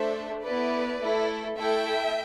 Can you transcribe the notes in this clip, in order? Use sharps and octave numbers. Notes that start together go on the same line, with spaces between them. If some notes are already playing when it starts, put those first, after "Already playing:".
Already playing: A3 D4 A4 C5 E5
B3 E4 A4 B4 D5
A3 E4 A4
A3 E4 A4 E5 G5